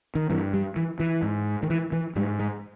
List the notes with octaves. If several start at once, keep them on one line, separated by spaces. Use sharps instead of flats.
D#3
G2 E3
G3
E3
E3
G#2
D#3
E3
E3
G#2 G3
G#3